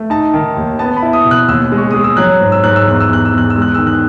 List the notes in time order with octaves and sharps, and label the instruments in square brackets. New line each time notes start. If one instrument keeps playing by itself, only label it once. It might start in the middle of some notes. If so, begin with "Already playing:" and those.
Already playing: [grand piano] A3
D#4 A5
D#3
D#2
B3 A5
B5
E4
D#6
B2
F#6
D#2 E6
G#3
C#6
G#3 D#6
E6
F#3 F#6
G#2
E6
G#2 F#6
E6
E2 F#6
E6
E2 F#6
E6
E2
F#6
E6
G#3
F#6
D#3 E6
F#6